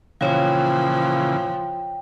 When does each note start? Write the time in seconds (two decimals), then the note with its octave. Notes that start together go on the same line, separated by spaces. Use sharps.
0.21 A#2 C#3 E3 F3 C#5 F5 G5